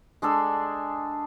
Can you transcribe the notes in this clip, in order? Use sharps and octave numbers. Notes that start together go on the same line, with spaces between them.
G#3 D4 G#4 A4